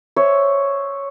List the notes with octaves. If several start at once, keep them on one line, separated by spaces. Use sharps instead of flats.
C5 C#5 E5